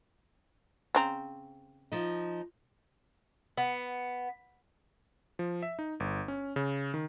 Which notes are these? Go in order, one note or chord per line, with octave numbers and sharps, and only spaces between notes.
C#3 C4 A#5
F3 D#4
B3
F3
E5
D#4
G1
C#4
C#3
D#3